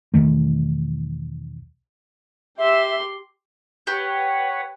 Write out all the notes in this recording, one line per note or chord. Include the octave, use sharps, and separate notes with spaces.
B1 E2 D#3 A3
G4 E5 C6
G4 B4 C#5 F#5